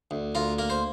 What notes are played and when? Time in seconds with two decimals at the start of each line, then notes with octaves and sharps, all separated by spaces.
0.11 D2
0.35 D2 F4 A#4
0.59 A#3 A#4
0.70 C5